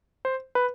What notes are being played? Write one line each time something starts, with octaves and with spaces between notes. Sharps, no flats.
C5
B4